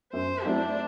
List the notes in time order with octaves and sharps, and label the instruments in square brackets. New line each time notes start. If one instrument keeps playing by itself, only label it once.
[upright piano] F#2 [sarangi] C5
[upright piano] F#3 A3 C4 E4 [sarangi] D4